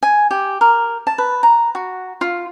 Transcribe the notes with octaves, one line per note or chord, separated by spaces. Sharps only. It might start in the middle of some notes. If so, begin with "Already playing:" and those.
G#5
G4
A#4
A5
B4
A#5
F#4
F4